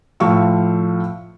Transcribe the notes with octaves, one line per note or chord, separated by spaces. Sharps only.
A2 F3 F5 C#6 E6